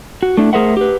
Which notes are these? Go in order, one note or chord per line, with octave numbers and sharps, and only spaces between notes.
F#4
A3 D4 E4
A3 G#4 A#4 C5 E5 F#5
G4 B4